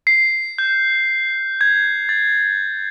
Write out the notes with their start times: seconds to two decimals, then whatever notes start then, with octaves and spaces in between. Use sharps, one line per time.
0.07 C7
0.58 G6
1.61 G#6
2.09 A6